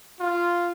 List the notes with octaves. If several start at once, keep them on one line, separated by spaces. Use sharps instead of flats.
F4